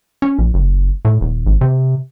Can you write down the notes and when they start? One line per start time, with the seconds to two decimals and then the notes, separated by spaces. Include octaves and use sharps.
0.22 C#4
0.39 A#1
0.54 F#1
1.05 A2
1.21 D#1
1.47 G#1
1.61 C3